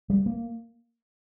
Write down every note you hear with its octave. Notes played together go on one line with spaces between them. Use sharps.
G3
A#3